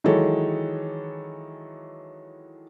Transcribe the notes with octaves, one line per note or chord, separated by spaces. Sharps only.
D#3 E3 F#3 G#3 A4 C#5